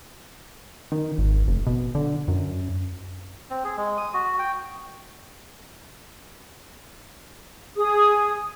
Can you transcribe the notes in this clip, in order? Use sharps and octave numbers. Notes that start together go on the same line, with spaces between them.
D#3
G#1
F1
B2
D3
F#2
C4
G#4
G#3
D#6
F#4
G5
G#4 D#6